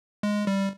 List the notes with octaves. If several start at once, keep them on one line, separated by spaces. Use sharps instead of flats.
G#3
G3